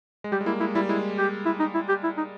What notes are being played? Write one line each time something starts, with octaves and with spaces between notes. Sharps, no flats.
G#3
G3 G4
G#3
A#3 E4
G#3 E4
G3 E4
G#3 E4
G4
E4
D#4
E4
G4
E4
D#4